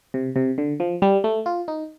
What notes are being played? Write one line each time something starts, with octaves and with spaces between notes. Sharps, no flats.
C3
C3
D3
F3
G3
A3
F4
D#4